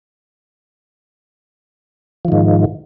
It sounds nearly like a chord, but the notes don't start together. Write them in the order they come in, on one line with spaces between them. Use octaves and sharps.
F3 D#3 G#2